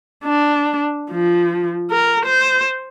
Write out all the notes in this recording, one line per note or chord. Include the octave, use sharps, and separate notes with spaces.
D4
F3
A#4
C5